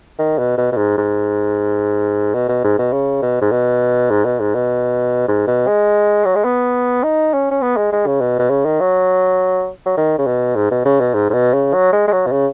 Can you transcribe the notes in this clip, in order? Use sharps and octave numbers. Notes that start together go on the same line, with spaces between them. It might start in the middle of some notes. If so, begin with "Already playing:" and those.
D#3
B2
B2
B2
G#2
G#2
B2
B2
G#2
B2
C#3
B2
G#2
B2
G#2
B2
G#2
B2
G#2
B2
G#3
F#3
G#3
B3
D#4
C#4
C#4
B3
G#3
G#3
C#3
B2
B2
C#3
D#3
F#3
F#3
D#3
C#3
B2
G#2
B2
C#3
B2
G#2
G#2
B2
C#3
F#3
G#3
G#3
F#3
B2
C#3